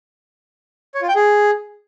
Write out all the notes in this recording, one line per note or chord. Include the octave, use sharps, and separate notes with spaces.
C#5
F4
G5
G#4